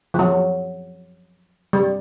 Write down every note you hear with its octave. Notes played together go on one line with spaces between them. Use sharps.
F3
F#3
G3